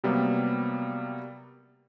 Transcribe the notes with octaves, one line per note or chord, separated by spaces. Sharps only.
C3 F#3 G3 A#3 B3